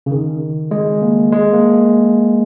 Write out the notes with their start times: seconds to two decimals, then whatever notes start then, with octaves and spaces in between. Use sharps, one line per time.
0.06 C#3
0.11 D#3
0.71 G#3
1.02 A#3
1.32 G#3
1.53 A#3